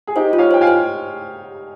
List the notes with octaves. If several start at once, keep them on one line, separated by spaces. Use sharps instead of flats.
G#4
D#4 G4 C5
F4
C#5 F5
C5 G5
F5 G#5
C5